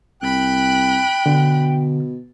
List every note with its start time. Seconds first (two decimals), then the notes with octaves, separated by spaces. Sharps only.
0.22 C2 G5 B5 F#6
1.26 B2 D3